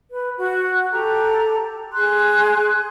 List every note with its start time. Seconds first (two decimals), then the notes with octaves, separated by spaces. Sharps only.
0.09 B4
0.37 F#4
0.92 G4 A4 A#5
1.94 G#4 C6 F#6